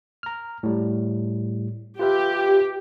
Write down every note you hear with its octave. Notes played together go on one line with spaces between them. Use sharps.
A#5 F6
A2 G3
F4 G4 B4 E5